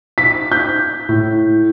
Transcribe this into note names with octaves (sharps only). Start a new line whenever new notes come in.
B6
G6
A2